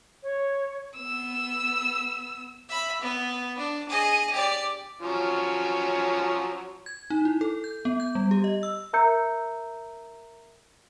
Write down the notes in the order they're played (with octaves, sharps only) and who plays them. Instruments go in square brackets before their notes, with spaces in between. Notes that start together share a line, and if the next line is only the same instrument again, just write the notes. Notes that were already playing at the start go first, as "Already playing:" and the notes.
[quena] C#5
[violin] B3 E6
[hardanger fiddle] E5 B5
B3
D4
G#4 D#5
G4 D5
[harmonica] F3 F#3 C#4
[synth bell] G#6
D#4
E4
A4
G6
B3
G6
G3
G4
D#5
E6
[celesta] A#4 E5 A#5 E6 G6 C#7